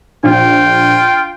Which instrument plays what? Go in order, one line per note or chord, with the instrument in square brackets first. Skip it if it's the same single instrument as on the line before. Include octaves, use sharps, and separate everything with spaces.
[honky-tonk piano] A#1 [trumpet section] F4 G5